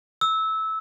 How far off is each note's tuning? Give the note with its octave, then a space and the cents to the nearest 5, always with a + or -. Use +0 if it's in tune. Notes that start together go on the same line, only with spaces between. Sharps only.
E6 -20